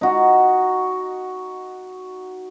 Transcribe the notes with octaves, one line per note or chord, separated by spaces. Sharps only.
D#4 F#4